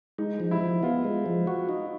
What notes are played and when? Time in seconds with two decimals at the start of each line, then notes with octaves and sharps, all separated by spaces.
0.18 G#3 D#4
0.40 F3
0.51 E4
0.61 F3
0.83 B3 F4
1.04 G#3
1.26 F3
1.47 F#4
1.69 D#4